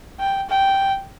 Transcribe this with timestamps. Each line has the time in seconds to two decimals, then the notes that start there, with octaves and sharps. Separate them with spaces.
0.20 G5
0.49 G5